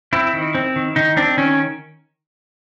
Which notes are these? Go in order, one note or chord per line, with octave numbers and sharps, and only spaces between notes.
C4 E4
D#3
C4
D#3
D#3 D#4
C4 D4
D#3 C#4